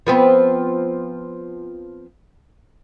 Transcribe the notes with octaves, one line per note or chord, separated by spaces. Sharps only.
F3 B3 C4